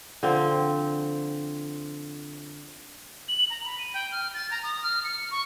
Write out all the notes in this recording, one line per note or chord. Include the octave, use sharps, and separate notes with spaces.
D3 F3 C4
F#7
A#5
B5
D#7
G5
F6
A6
A#5
D#6
F6
C#7
C#6